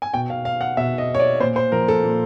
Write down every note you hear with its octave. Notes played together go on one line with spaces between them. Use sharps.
G#5
B2 G5
F5
F5
F#5
B2 E5
D#5
C#5
D5
A#2 C5
C5
F3 A#4
A4
A#2